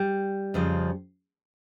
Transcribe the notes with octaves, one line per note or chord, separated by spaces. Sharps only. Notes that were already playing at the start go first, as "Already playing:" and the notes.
Already playing: G3
F2 C#3 F3